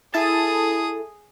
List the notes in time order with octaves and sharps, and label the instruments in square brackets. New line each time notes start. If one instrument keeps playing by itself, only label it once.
[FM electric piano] E4 A4 A5 [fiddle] G#4 D#6